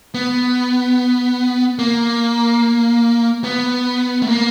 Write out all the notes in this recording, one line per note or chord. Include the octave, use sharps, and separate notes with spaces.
B3
A#3
B3
A3
A#3